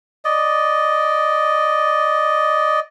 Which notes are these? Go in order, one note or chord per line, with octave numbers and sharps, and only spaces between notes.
D5 D#5